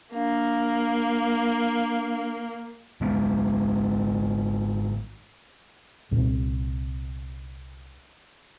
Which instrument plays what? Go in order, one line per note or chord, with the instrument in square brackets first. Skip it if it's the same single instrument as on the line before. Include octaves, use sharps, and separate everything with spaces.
[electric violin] A#3 [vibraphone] D4 F5
[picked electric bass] G#1 G#3 B3
[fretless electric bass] C2 A#2 C4